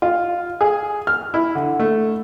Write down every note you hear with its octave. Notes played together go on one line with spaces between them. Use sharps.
F4
G#4
F6
E4
D3
A3